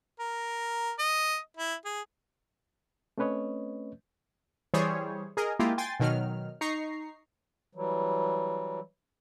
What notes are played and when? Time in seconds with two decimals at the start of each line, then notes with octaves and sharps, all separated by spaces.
0.19 A#4
0.99 D#5
1.57 E4
1.85 G#4
3.18 A3 C4 C#4 B4 C#5 D#5
4.74 E3 G3 G#4 C5 C#5
5.37 G#4 A#4 D#5
5.59 G#3 A#3 E4 F4 G4
5.78 G5 G#5 C6 A6
6.00 B2 D#3 F#3 F6
6.61 D#4 A#5 C#6 C7
7.75 E3 F#3 G3